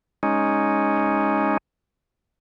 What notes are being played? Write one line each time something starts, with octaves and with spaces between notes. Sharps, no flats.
G#3 C#4 D#4